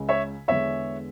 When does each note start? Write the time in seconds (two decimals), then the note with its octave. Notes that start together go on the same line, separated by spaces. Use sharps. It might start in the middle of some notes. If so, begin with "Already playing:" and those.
Already playing: C#2 C#3 G#3
0.09 C#5 E5
0.48 E2 D3 G#3 C#5 E5